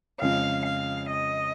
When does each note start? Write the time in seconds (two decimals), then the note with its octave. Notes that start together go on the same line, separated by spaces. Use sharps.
0.21 F2 C#3 G#3 F5
0.66 F5
1.11 D#5